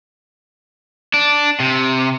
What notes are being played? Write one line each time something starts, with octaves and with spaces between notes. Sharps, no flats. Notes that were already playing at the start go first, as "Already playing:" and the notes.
D4
C3